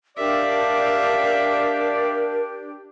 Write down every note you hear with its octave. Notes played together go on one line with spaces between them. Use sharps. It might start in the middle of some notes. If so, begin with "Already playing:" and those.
D4 G4 A#4 D5 E5 F5